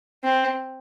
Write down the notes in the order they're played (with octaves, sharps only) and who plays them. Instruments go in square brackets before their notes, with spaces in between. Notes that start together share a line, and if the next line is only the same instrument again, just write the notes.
[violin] C4